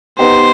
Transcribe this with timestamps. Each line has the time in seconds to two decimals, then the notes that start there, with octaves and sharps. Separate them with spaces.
0.18 B3 D#4 G4 C5